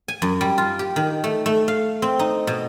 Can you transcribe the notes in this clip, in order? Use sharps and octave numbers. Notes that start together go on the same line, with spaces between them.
G#5
F#2
G3
F4
G4
D#3
A3
A3
F5
C4
D#4
B2